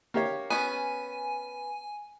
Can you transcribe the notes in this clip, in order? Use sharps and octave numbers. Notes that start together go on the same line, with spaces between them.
A#3 G4 C#5
B3 C#4 G#5